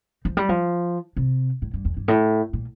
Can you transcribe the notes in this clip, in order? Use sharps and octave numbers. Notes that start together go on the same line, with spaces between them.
F3
G3
F3
C3
A2
G2
E2
G2
A2
A#2